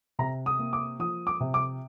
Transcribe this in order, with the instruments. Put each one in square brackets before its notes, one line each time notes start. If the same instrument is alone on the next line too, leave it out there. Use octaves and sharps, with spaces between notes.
[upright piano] C3 A#5
D#6
A#3
D6
F3 D#6
D6
C3
D6